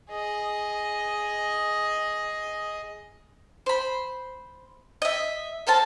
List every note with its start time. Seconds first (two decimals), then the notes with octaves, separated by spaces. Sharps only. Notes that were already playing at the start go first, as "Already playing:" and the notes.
0.10 G#4 D#5
3.66 C5 B5
5.02 D#5 E5
5.67 A4 A#4 C5 A5